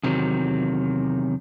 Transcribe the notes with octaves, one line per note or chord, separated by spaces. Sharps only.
E2 C3 D#3 F#3